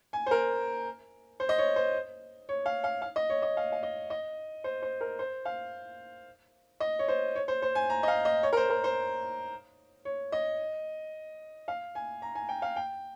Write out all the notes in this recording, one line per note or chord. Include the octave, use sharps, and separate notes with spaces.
G#5
C5
A#4
C5
D#5
C#5
C5
C#5
F5
F5
F5
D#5
C#5
D#5
F5
F5
D#5
D#5
C5
C5
A#4
C5
F5
D#5
C#5
C5
C#5
C5
C5
G#5
A#5
D#5
F5
D#5
C#5
A#4
C5
A#4
C5
C#5
D#5
F5
G#5
A#5
G#5
G5
F5
G5